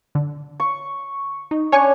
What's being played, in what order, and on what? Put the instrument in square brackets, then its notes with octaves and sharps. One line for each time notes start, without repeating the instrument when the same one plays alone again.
[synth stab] D3
[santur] C#6
[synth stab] D#4
[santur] C#4 D4 [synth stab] C#5 G#5 C#6